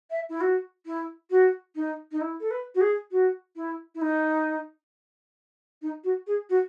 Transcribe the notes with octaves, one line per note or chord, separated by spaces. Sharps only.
E5
E4
F#4
E4
F#4
D#4
D#4
E4
A4
B4
F#4
G#4
F#4
E4
E4
D#4
D#4
F#4
G#4
F#4